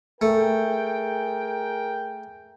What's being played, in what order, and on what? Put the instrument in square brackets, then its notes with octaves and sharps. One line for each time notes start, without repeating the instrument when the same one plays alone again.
[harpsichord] A3 [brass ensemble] G#4 A#4 G5